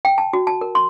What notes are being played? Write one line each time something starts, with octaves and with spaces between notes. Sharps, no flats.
G5
A5
F#4
A5
A#4
C6